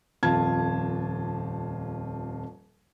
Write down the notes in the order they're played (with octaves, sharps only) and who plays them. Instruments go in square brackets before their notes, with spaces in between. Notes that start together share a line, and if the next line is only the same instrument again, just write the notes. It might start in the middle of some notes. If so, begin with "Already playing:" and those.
[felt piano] D#1 F2 F4 A5 G#6